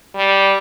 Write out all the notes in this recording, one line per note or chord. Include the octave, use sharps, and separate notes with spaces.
G3